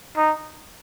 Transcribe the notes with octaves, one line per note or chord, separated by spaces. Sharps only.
D#4